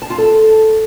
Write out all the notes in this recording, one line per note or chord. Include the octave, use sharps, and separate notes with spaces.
A5
F4
A4